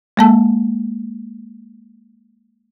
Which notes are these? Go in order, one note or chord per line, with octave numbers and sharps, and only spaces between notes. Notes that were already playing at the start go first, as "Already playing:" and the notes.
G#3 A#3 A5